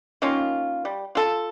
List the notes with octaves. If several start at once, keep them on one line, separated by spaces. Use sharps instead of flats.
D#3 A#3 C#4 F4
G3
F4 A4